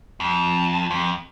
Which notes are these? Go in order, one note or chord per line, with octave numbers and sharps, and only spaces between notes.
F2
F2